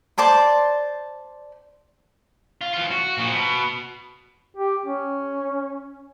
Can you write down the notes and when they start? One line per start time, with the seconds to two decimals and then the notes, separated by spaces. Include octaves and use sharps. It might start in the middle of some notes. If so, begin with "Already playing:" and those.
0.18 C5 D5 A5 C6
2.61 F4
2.74 E3 F4
2.91 F#4
3.18 A#2 F3
3.33 B2
4.57 G4
4.86 C#4